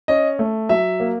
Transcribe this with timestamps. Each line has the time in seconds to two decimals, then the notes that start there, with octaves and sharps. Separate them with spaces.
0.08 C#4 D#5
0.39 A3
0.69 F#3 E5
1.00 A#3